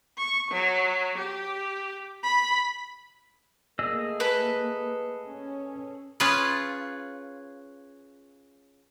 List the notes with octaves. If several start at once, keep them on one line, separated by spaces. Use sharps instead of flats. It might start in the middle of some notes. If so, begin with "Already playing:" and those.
C#6
F#3
G4
B5
A3 A#3 G#4 D#5 E6
A4 B4
C#4
C#4 F4 G#4 B4